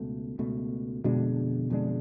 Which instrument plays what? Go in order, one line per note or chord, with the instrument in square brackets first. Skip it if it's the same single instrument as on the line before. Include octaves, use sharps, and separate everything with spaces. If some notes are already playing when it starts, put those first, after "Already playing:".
Already playing: [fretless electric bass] C#2 B2 A3
C#2 B2 A3
[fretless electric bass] F2 D3 G#3 D4 [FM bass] B2
[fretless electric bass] F2 D3 G#3 D4